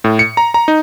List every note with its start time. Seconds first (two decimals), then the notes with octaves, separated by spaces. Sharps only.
0.04 A2
0.19 C#7
0.37 A#5
0.54 A#5
0.68 D#4